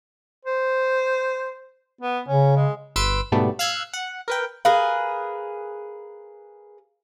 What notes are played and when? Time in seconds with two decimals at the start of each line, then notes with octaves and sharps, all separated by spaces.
0.45 C5
2.01 B3
2.28 C#3 C#4
2.56 G#3
2.96 G1 B4 C6 E6 D7
3.32 G#2 B2 G3 A3 B3 D4
3.59 F5 E6 F#6 G#6
3.93 F#5
4.28 A#4 B4 G5
4.65 G#4 A#4 B4 F5